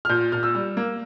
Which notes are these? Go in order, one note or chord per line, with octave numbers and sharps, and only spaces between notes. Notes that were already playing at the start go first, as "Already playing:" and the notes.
F6
A#2 G6
A#2 F6
E6
G3
A#3